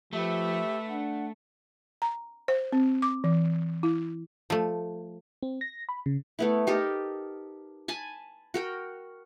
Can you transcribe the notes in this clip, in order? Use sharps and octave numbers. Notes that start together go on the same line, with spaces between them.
F3 A3 G4 B4 E5
D4 F#5
A#5
C5
C4
D6
E3
E4
F3 A3
C4
A#6
B5
C#3
A3 B3 E4
D#4 G4 A4 A#4
G#5 A5 B5
F#4 A#4 G5